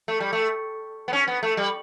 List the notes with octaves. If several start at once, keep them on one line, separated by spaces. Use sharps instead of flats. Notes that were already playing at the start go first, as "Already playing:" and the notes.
A3
G3
A3
B3
C#4
B3
A3
G3